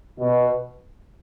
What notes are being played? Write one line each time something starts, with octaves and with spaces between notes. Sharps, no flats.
B2